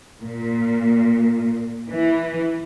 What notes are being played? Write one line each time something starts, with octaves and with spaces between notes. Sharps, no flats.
A#2
E3